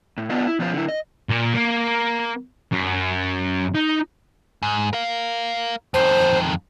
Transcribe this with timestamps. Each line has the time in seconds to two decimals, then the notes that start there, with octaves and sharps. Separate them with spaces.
0.18 A2
0.30 B3 D4 F4 D#5
0.47 E4
0.59 B2 F3 C#4 F4 A#4 C5
0.73 D3 E4
0.89 D#5
1.29 A#2
1.54 A#3
2.72 F#2
3.74 D#4
4.62 G#2
4.93 A#4 F5
5.94 F2 D#3 C5